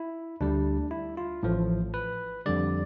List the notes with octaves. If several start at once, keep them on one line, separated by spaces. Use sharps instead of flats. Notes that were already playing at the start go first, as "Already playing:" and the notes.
Already playing: E4
D2 D3 G3 D4
E4
F4
A1 A2 F3 A3
B4
F2 D3 G3 D5